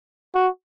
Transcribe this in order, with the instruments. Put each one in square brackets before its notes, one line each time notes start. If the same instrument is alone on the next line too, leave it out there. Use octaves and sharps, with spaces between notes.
[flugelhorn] F#4